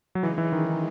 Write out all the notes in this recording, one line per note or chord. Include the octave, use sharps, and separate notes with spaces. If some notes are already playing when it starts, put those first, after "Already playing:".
F#3
C#3 E3 G#3 D#4
E3
D#3